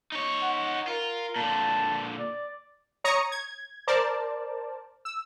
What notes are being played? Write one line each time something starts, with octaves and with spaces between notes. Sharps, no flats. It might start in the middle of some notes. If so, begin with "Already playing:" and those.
D#4 C#5
F#5
F4 A#4
A#2 D3 A5
D5
C#5 A#5 C#6 D#6 A#6 C#7
G#6
A#4 C5 D5 A5
E6